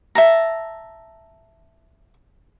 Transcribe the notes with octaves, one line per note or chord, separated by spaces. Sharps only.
E5 A5 A#5